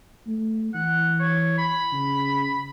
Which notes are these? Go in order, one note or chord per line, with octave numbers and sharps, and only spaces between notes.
A3
E3 F#5
C#5
B5
C#3